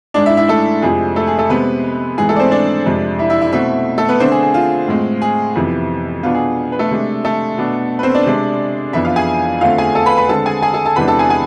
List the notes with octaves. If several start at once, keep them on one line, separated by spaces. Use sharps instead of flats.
G#2 G#3 D4 D5
E4 E5
E4 E5
A3 A4
F2 C3 F3 G#3 G#4
A3 A4
G#4
A3 A4
C3 G#3 B3 C4 B4
G#2 E3 G#3 B3 G#4
A3 A4
D5
C4 C5
D4 D5
F2 C3 G#3 D4
E4 E5
E4 E5
E4 E5
B2 A3 C4 E4 E5
A3 A4
B3 B4
D3 A3 C4 D4 C5
G#4
G#4
F4
A2 G#3 C4
G#4
F2 C3 E3 B3
B2 B3 D4 F4
G#4
B4
A3 A4
C3 G#3 D4
A3 A4
B2 B3 D4
B4
C4 C5
D4 D5
C3 G#3 D4
F2 E3 B3 D4 E4 E5
F4 F5
G#4 G#5
E2 D3 A3 C4 F4 F5
G#4 G#5
A4 A5
B4 B5
B4 B5
D3 G#3 C4 A4 A5
G#4 G#5
G#4 G#5
A4 A5
A4 A5
E2 C3 E3 G#3 D4 B4 B5
A4 A5
G#4 G#5
G#4 G#5